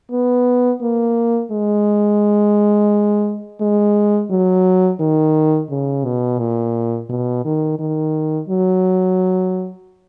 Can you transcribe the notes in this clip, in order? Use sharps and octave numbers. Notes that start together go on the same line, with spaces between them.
B3
A#3
G#3
G#3
F#3
D#3
C#3
B2
A#2
B2
D#3
D#3
F#3